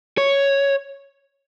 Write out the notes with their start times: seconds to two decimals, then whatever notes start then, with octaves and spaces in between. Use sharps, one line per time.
0.18 C#5